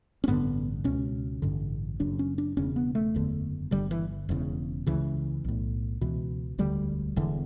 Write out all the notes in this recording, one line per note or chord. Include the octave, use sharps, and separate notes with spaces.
C#4
A1 G2 D3 B3
C#2 B2 C#4
A1 G2 D3
F#1 F#2 C#3 D4
C#4
D4
E1 E2 C#3 C#4
B3
A3
F#1 E2 D3
G1 G2 D3 G3
E3
E1 E2 C#3
C#2 C#3 E3
B1 A2
C#2 B2 E3
E1 D2 D3 G3
E1 E2 D3